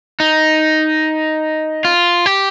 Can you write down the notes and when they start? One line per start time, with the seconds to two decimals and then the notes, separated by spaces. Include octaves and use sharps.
0.20 D#4
1.85 F4
2.26 G4